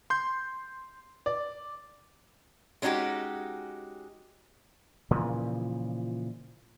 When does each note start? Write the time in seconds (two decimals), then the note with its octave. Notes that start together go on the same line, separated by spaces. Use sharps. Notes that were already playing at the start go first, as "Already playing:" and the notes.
0.10 C6 G6
1.26 D5
2.82 G#3 C#4 D#4 F#4 G4
5.11 A#2 C#3 E3 F3